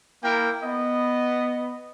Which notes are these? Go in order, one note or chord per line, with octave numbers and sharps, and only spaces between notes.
A#3 E4 A#4 G5
B3 D#5